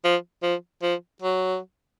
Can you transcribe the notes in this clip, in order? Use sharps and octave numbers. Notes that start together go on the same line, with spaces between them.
F3
F3
F3
F#3